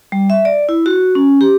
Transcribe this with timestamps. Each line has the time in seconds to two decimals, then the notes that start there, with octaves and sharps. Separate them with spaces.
0.12 G3
0.30 E5
0.45 D5
0.69 E4
0.86 F#4
1.15 C#4
1.41 G4